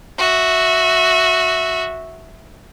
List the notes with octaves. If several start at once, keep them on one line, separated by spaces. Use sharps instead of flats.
F#4 E5